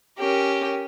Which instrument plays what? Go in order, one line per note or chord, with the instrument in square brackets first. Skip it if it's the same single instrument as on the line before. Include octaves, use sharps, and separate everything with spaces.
[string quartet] C#4 G4 A#4